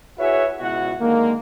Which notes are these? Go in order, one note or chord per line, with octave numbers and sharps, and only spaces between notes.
E4 F#4 G#4 B4 C#5 E5
C#2 B2 E4 F#4 F#5
D3 D#3 G#3 A#3